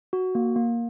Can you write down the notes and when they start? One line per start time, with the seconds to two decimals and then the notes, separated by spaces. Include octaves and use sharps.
0.13 F#4
0.35 A#3
0.56 A#3